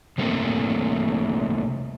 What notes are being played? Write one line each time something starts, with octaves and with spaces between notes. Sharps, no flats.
C3 G3 A3 A#3 C4